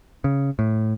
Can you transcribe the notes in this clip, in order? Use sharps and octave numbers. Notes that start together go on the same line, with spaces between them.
C#3
A2